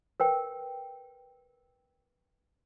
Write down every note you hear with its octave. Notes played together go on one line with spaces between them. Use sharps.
A#4 B4 G5